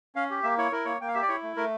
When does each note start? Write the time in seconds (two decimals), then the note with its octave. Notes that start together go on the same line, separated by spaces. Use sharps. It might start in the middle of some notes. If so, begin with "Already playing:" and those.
0.15 C#4 F5
0.30 G4
0.43 A#3 E5
0.57 E4 C#5
0.72 E4 A#4
0.85 A#3 C#5
1.01 A#3 G5
1.08 F5
1.15 G4 E5
1.22 D5
1.28 E4 C#5
1.43 A3
1.56 A3 A#4